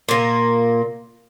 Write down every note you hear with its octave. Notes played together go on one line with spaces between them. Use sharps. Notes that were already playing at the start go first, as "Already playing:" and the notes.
A#2 A#3